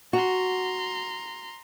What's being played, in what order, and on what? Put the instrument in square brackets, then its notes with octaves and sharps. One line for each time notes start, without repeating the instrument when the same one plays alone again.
[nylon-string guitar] F#4 [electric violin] A#5 C6